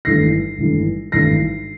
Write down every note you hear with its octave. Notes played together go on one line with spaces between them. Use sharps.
G#1 G2 E3 A3 A#6 C7
G#1 G2 E3 A3
G#1 G2 E3 A3 A#6 C7